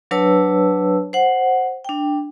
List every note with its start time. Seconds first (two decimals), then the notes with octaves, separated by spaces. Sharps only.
0.11 F#3 D4 B4 C#5 A5 E6
1.13 C5 F#5
1.85 D4 G5